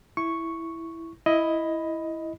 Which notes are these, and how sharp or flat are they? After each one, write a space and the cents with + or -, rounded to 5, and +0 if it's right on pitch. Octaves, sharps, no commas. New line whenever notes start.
E4 +0 C#6 +0
E4 +0 D#5 +10 B5 +0